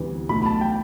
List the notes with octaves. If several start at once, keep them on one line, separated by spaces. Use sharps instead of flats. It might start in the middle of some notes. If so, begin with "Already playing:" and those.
Already playing: D2 C3 E3 G3 B3
B1 B2 A3 B5
A5
G5